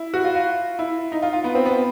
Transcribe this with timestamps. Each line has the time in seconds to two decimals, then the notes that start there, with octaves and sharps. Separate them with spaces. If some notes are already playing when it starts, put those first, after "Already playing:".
Already playing: E4
0.14 F#4
0.24 F4
0.35 F4
0.79 E4
1.12 D#4
1.22 F4
1.33 F4
1.44 B3
1.55 C4
1.66 B3